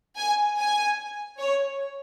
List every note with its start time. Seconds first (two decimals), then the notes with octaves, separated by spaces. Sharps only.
0.18 G#5
0.58 G#5
1.38 C#5